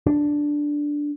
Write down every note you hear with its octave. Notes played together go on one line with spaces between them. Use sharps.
D4